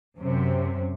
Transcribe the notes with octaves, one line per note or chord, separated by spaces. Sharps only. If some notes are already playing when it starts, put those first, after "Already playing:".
F#2 C3